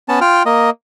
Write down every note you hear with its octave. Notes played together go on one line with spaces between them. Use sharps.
B3 C#4 A5
F4 G5 F6
A#3 D#5